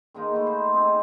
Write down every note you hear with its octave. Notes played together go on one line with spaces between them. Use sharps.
D#3 G#3 A#3 D#4
A3 B3
C5 C6
C4 D#4 G#4 C5